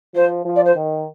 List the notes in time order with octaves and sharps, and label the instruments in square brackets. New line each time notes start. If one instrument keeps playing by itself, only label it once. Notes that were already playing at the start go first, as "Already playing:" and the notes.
[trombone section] F3 [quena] C5
[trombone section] F3
[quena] D5
C5
[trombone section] D#3